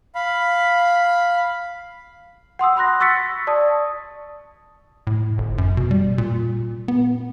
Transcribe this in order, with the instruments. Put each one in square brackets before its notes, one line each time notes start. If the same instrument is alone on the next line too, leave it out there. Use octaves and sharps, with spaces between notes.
[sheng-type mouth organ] F5 B5
[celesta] F#5 C6 D#6 E6
B5 C6 F#6 A#6
C#6 E6 A6 B6 C#7
D5 A5 D#6
[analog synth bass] A2
G1
F#2
B2
G3
A#2
B3